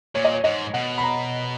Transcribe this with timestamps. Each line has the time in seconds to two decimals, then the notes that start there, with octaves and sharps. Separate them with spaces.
0.15 A#2 C#5
0.24 D#5
0.34 C#5
0.44 G#2 D#5
0.74 B2 F#5
0.98 B5
1.03 A#5